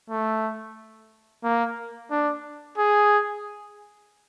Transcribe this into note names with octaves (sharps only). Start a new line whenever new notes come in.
A3
A#3
D4
G#4